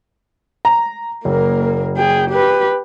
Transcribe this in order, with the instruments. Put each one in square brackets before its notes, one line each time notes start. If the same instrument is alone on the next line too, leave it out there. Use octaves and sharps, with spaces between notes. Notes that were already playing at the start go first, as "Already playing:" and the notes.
[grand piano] A#5
[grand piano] F#1 [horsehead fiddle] A#3 A#4
[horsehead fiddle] G#4 G5
G4 B4